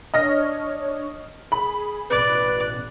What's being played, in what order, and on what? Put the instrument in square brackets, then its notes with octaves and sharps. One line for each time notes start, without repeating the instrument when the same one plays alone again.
[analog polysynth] D4 C#5 [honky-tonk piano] D#5 F6 A#6
[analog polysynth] G#4 [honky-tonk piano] B5
[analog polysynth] A1 B2 F#6 [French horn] B4 [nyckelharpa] D5